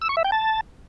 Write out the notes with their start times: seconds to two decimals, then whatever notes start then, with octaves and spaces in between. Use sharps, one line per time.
0.02 E6
0.09 C#6
0.17 E5
0.24 G5
0.32 A5